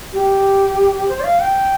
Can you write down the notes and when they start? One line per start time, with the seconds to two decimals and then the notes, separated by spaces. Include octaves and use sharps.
0.13 G4
1.08 C5
1.20 D5
1.24 F5
1.40 G5